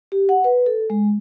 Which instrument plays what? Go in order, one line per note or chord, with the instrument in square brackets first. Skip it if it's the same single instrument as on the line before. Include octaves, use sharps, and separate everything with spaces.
[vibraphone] G4
F#5
B4
A4
G#3